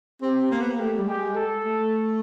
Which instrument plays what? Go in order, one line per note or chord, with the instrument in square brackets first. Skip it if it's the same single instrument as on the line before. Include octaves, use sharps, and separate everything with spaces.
[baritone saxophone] C4 [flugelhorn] G4
[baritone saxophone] A#3
B3
A#3
[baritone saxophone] A3 [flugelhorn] G4
[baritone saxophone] G3
[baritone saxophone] G#3 [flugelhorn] G4
[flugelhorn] A4
[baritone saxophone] A3